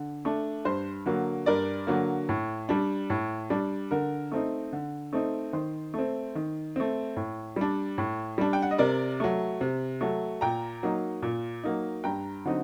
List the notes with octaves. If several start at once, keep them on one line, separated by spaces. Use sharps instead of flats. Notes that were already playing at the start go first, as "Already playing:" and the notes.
Already playing: D3
A3 D4
G2 C5
D3 F#3 A#3
G2 A#4 D5
D3 F#3 A#3
A2
G3 D4
A2
G3 D4
D3 A#4
A3 C4 D#4
D3
A3 C4 D#4
D#3 C5
A3 C4
D#3
A3 C4
A2
G3 D4
A2
G3 D4
G5
F#5
D#5
C3 A#4 D5
F#3 A3
C3
F#3 A3
A#2 G5 A#5
F#3 A#3 D#4
A#2
F#3 A#3 D#4
G2 G5 A#5
D3 F#3 C4 D#4